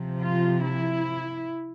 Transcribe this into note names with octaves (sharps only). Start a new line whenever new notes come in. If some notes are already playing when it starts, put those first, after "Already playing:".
Already playing: C3 F3
F4
E4